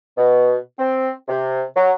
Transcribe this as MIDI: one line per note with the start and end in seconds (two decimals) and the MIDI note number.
0.17 0.56 47
0.79 1.11 60
1.28 1.62 48
1.76 1.92 54